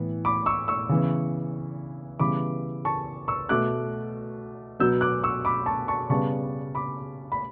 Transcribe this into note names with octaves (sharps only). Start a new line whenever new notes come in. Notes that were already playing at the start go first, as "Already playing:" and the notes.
Already playing: A2 E3 B3
B5 D6
C#6 E6
C#6 E6
C#3 E3 B3
C#3 E3 G3 B3 B5 D6
A5 C#6
C#6 E6
B2 A3 D6 F#6
B2 F#3 B3 E6 G6
D6 F#6
C#6 E6
B5 D6
A5 C#6
A5 C#6
C#3 G3 B3 A5 C#6
B5 D6
B5